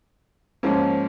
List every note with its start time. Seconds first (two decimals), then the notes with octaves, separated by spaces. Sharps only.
0.63 G#2 F3 A#3 C#4